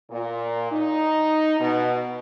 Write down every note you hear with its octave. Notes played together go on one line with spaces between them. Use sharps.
A#2
D#4
B2